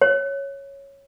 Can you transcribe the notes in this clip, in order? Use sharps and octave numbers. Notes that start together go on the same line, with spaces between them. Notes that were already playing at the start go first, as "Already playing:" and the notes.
C#5